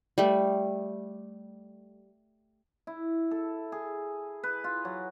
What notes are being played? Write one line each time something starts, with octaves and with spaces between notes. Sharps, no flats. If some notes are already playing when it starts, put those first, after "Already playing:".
G3 A3
E4
A4
G#4
B4
F4
F#3